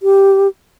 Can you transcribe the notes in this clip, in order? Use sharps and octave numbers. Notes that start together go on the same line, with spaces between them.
G4